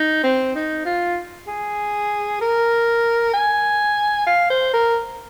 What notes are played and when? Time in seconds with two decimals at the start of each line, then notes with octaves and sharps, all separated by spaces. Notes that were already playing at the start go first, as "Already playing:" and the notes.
Already playing: D#4
0.23 C4
0.55 D#4
0.85 F4
1.48 G#4
2.41 A#4
3.34 G#5
4.27 F5
4.50 C5
4.73 A#4